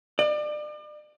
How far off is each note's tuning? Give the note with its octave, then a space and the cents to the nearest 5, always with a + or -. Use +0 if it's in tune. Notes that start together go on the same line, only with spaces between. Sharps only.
D5 +35